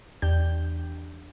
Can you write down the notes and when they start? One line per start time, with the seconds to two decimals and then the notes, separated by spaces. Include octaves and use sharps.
0.22 E2 D4 G4 G6